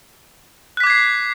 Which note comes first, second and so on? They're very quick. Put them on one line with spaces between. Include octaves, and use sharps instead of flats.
F#6 B6 D6 G#6 C7